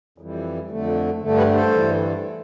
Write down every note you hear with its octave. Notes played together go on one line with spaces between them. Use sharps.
F2 E3 G3
F2 D3 A3
G2 D3 A3
G4 B4
A4 C5
G2 E3 G3